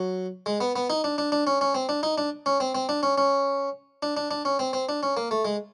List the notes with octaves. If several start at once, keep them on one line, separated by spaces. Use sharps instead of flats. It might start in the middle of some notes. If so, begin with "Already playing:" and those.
Already playing: F#3
G#3
B3
B3
D#4
D4
D4
D4
C#4
C#4
C4
D4
D#4
D4
C#4
C4
C4
D4
C#4
C#4
D4
D4
D4
C#4
C4
C4
D4
C#4
A#3
A3
G#3